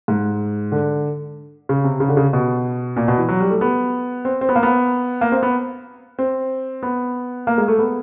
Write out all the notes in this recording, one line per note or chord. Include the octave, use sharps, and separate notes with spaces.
G#2
D3
C#3
C3
C#3
D3
C#3
B2
A#2
B2
E3
F#3
G3
A3
B3
C4
C4
B3
A#3
B3
A#3
C4
B3
C4
B3
A#3
G#3
A3
B3